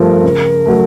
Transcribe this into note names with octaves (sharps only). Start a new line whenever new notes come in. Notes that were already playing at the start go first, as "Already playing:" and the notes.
Already playing: G2 F3 A3 A#4
C#3
F#3 A3